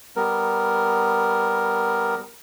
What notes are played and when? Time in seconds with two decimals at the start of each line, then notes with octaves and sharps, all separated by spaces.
0.16 G3 B3 A#4